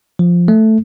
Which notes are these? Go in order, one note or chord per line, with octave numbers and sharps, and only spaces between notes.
F3
A3